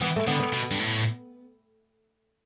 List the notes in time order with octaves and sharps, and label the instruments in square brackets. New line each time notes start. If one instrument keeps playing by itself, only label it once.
[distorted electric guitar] E3 [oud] B3
[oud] A3
[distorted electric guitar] D3 [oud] B3
[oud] B3
[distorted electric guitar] B2
G2
A2